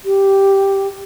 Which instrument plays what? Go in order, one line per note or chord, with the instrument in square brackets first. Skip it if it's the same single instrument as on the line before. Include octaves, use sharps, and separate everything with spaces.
[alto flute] G4